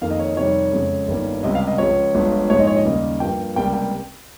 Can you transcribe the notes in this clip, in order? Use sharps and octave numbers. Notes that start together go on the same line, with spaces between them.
F2 D#3 A#3 F5
D#5
C#5
D#5
F2 C3 D#3 G3 C#5
F2 C#3 G#3
G1 G2 D#3 G3 A#3
C#2 C3 G3 D#5
F5
D#5
C#2 C#3 F3 C#5
G1 G2 F3 G#3
A#1 G#2 F3 G#3 C#5
D#5
C#5
D#5
D#2 C#3 G3 A#3
G2 F3 A#3 G5
C#2 C3 G3 A#3 G5
G5